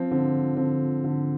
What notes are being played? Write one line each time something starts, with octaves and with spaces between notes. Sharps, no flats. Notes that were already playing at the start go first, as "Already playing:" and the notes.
Already playing: F3 C4
D3 C4
D3 C4
D3